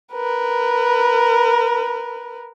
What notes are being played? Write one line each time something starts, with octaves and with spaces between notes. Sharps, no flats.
A#4 B4